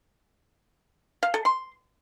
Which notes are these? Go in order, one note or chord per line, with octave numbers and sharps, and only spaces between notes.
F5
A4
C6